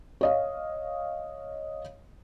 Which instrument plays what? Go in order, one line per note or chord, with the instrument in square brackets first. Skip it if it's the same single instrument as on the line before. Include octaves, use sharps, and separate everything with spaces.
[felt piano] C#5 D#5 F5